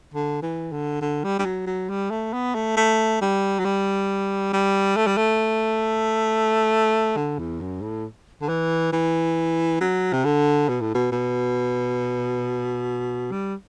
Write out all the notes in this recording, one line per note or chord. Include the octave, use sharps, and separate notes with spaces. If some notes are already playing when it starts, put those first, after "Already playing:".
D3
E3
D3
D3
G3
G3
F#3
F#3
G3
A3
B3
A3
A3
G3
F#3
G3
G3
A3
G3
A3
D3
E2
F#2
A2
D3
E3
E3
F#3
C3
D3
B2
A2
B2
B2
G3